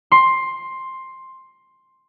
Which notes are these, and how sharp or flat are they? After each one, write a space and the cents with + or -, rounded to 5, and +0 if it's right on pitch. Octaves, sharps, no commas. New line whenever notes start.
C6 +10